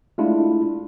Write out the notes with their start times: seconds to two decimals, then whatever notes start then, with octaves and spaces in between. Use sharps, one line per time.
0.18 G#3 A3 D4 E4 F4